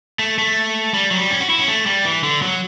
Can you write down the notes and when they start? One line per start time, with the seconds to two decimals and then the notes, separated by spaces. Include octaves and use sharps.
0.19 A3
0.38 A3
0.94 G3
1.11 F#3
1.18 G3
1.30 C#4
1.40 F#4
1.50 E4
1.59 C#4
1.68 A3
1.86 G3
2.05 E3
2.23 D3
2.42 F#3